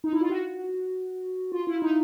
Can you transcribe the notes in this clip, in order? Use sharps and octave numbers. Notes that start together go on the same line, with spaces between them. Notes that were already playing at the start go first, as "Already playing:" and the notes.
D#4
E4
F4
F#4
F4
E4
D#4